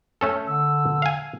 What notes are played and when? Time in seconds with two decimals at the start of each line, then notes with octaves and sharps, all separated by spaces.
0.21 A3 C#4 A4
0.47 D3 E6
1.02 F5 G#5